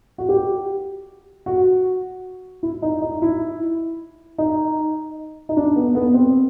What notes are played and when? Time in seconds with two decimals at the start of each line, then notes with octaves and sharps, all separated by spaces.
0.18 F#4
0.29 G4
1.46 F#4
2.63 E4
2.82 D#4
3.02 D#4
3.22 E4
4.38 D#4
5.49 D#4
5.57 D4
5.76 B3
5.95 B3
6.14 C4